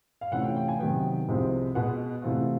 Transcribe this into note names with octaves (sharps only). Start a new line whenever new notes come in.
F5
C3 E3 A3 C#4 F4 F#5
G5
G5
G#5
C3 D#3 F#3 B3 G5
C2 C3 F3 G#3 C4
B2 G#3 B3 F#5
C3 E3 A3 C4 F4